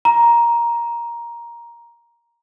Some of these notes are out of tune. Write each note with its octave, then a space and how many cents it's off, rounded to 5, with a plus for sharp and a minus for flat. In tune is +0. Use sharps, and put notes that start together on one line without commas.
A#5 +10